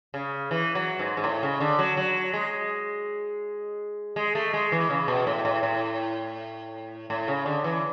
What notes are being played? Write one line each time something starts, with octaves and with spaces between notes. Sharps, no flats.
C#3
E3
F#3
G#2
G#2
A2
C#3
D3
F#3
F#3
G#3
G#3
A3
G#3
E3
C#3
B2
A2
A2
A2
A2
C#3
D3
E3